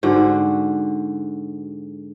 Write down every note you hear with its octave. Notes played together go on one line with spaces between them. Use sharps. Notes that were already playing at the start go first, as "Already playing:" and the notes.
G#2 D3 F#4